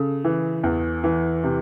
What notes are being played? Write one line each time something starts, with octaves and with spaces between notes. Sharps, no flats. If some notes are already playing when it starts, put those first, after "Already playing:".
Already playing: C#3 A4
E3
E2
E3
C3